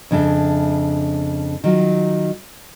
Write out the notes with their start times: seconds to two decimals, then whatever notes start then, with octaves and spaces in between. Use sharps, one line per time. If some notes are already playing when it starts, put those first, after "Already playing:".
0.11 F2 C#3 D4 E5
1.64 D#3 F#3 F4